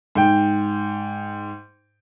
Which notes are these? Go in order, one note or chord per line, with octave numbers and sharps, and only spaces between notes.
G#2 G5